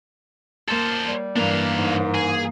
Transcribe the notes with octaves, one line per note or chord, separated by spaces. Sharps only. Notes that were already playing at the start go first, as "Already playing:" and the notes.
A#3 A4 C5
G3
G2 E3 A#3 D4 F5
G#2
G#4